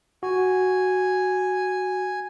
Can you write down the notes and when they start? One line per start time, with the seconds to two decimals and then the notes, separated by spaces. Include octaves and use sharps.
0.23 F#4 G#5